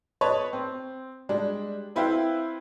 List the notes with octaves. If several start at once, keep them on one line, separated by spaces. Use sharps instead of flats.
B4 C#5 D#5 A5 C#6
C4
G3 G#3 D4
C4 E4 B4 E5 F5 G5